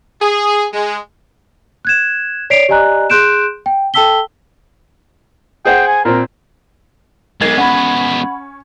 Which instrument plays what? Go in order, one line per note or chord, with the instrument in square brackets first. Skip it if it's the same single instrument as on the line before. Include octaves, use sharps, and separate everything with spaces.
[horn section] G#4
G#3
[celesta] F#6 G#6 E7
C#5 D5 B6 C7 D7 F7
G4 D5 D#5 G#5 A#5 F#6
G#4 C6 F#6 G6 D7 E7
G5
A4 G5 A5 E6 B6 G7
[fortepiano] G#4 C5 F#5 [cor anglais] G5
[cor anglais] G#5
[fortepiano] A#2 C4 [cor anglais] A#4
[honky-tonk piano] B1 G#6 A6 [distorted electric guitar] G#3 B3 [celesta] A#4 C7
[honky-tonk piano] C#4 [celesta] F#5 B5